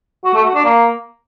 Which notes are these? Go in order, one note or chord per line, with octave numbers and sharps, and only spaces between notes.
F#4
A3
F#4
D4
A#3